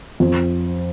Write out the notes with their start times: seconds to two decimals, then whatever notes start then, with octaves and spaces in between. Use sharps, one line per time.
0.20 F2